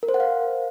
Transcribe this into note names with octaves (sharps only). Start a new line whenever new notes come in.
A#4
C5
F#5
F5